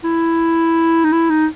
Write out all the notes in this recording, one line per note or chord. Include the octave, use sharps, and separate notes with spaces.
E4
D#4
E4
D#4